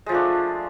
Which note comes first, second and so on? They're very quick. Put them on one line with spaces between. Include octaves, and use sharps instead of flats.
G#3 F3 A3 D4